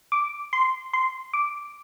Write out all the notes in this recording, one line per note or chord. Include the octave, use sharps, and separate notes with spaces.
D6
C6
C6
D6